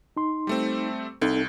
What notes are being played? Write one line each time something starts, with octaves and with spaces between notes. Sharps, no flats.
D#4 C6
G3 A3 C4
C2 C4 D#4 A4